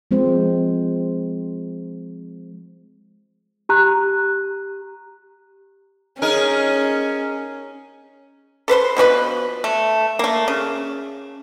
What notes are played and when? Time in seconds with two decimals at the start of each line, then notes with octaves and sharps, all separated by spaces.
0.11 F3 G#3 C4 C5
3.69 G4 A#5 F#6
6.22 C#4 D#4 G#4 A#4
8.68 A4 B4 C5 C6
8.97 B2 F3 C#4 B4
9.64 A3
10.19 A3 A#3
10.48 C#3